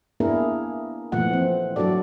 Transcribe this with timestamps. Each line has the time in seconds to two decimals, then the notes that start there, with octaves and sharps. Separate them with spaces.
0.20 A#3 B3 D4 E4 G#4 A#4
1.12 A#2 E3 F3 A3 F#5
1.33 C4
1.76 F#3 D4 F#4 A4 D5